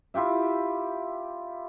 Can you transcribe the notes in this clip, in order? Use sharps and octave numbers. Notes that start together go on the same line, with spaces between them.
E4 F4 G4 E5